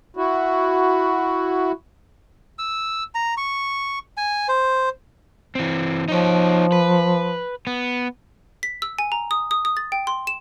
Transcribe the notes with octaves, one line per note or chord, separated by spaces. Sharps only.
E4 F#4
E6
A#5
C#6
G#5
C5
E3 C4
F3 D#4 C#5
B4
B3
B6
E6
G#5
A#5
D#6
D#6
D#6
A6
G5
C6
E7